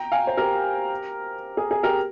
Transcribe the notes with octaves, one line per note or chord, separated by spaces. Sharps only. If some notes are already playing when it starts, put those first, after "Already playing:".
Already playing: G5 A#5
F5 G#5
C5
G4 A#4
G#4
G#4
G4 A#4